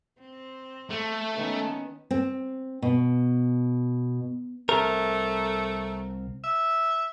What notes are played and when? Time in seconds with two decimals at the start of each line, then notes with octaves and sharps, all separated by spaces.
0.20 C4
0.91 A3
1.35 D#3 B3 C#4
2.11 C4
2.82 B2
4.69 C2 A3 C4 A#4
6.44 E5